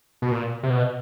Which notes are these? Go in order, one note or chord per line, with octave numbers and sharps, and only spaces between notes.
B2
A#2
C3
B2